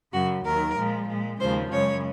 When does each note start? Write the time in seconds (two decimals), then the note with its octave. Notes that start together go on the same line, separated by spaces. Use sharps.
0.13 F#2 C#3 F#3 F#4
0.45 D#2 D#3 F#3 A#4
0.77 A#2 F3 G#3
1.09 A#2 G#3
1.40 D#2 C#3 F3 G#3 C5
1.72 F#2 C#3 G#3 C#5